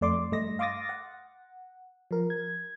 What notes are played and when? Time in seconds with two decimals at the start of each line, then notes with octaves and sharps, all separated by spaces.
0.01 F2 A3 D5 C6 D6
0.32 G2 A3 D#5 A#6
0.59 F5 C6 D6 D#6 A6 A#6
0.89 F#5
2.11 F3 A#4
2.30 G#6